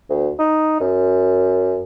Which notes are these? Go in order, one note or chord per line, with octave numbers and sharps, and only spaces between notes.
D2
D#4
F#2